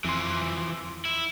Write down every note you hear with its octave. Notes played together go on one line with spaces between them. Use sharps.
F2 E3 F3 C6
E4